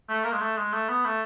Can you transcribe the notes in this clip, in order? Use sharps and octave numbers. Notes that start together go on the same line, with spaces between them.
A3
A#3
G#3
A3
G#3
A3
B3
A3